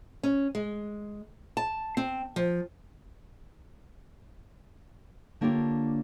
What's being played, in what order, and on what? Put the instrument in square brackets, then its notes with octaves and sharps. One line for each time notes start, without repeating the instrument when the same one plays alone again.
[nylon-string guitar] C#4
G#3
A5
C4
F3
D3 A#3 D4 F4 G4 C#5